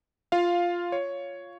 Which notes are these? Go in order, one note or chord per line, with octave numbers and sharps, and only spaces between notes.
F4 F5
C#5